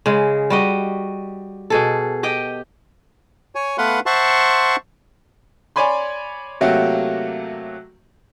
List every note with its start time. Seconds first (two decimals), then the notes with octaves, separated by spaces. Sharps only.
0.06 C#3 G#3
0.50 G3 F#4 D#5
1.70 B2 G#4 A4
2.23 G4 D#5 G5
3.55 C#5 G#5
3.78 A3 B3 B4 F5 F#5 C6
4.06 C5 E5 F#5 A5 C6 C#6
5.76 C#5 D5 G#5 B5 C6
6.61 C3 F#3 A3 A#3 F#4 G4